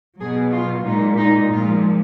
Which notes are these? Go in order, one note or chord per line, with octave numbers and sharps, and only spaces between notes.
B2 F#3 G#4
F4
A#2 G#3 D#4
D#4
A#2 F3 G#3 F4